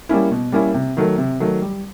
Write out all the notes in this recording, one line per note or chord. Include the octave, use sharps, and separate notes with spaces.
G3 A#3 C#4 E4
B2
G3 A#3 C#4 E4
C3
D#3 F#3 A3
C3
D#3 F#3 A3
G3